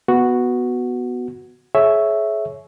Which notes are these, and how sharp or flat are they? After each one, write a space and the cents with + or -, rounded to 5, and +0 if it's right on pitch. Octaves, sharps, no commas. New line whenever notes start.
B3 +0 F#4 +0
G#4 +35 C#5 +0 E5 +0